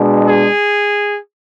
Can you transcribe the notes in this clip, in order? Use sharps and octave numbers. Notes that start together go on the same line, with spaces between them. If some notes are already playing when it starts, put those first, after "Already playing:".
Already playing: B2 G#3 D4
G#4